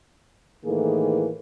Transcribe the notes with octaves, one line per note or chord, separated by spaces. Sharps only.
A2 D#3 E3 A#3 G#4 A4